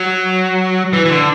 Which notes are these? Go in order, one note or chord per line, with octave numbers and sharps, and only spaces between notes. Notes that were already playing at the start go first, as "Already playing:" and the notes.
Already playing: F#3
E3
E3
D3